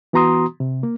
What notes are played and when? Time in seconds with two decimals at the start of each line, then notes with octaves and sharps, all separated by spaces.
0.13 E3 B3 F#4 A#5 C6 D#6
0.60 C3
0.83 A#3